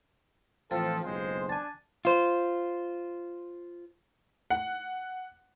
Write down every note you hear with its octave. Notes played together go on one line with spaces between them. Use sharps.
A2 E3 F3 C4 F4 A4
F#1 B1 G#3 C5
D4 G#5 A5
F4 C5
F#5